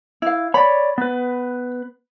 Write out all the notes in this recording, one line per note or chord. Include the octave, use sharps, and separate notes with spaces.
E4 F5
C#5 D5 B5
B3 B4